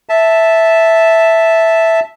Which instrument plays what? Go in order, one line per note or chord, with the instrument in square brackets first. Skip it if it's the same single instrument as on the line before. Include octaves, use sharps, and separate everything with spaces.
[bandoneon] E5 A5